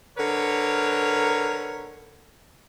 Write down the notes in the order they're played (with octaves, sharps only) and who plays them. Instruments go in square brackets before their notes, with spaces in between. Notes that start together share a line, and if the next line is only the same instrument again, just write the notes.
[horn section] D3 A#4 B4 C#5